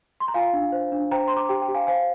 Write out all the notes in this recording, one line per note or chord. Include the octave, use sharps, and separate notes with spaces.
C6
A#5
F4 F5 G#5
D4
C5
D4
C5 G5 A#5
C5 C6
A#5 D6
G4 G5
G5
G4
F5 G#5
C5 F5 G#5